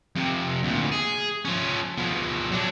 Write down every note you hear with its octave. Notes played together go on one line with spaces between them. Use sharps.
F2 C3
D2 A#2
G#4
F3 C#4
B2 F3
F#3 D4